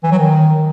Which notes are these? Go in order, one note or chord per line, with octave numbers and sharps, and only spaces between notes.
E3
F#3
D#3